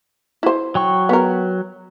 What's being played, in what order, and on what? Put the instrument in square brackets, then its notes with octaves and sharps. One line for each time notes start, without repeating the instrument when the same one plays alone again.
[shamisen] E4 C5
[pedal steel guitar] F#3 G5 C#6
[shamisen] B3 A#4